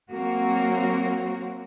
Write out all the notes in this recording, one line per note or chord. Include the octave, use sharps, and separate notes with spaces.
F#3 A#3 C4 F#4